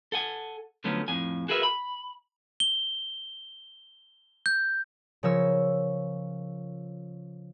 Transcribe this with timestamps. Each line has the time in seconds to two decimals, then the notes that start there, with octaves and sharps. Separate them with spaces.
0.12 A4 F#5 G#5
0.84 D3 F3 F#3 A3 B3 C#4
1.08 F2 A2 G#5
1.48 F#4 G#4 A#4 B4 E5
1.63 B5
2.60 G7
4.46 G6
5.23 C#3 F3 A#4 C#5 E6